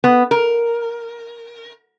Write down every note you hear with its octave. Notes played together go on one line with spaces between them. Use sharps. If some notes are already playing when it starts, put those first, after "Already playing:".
B3
A#4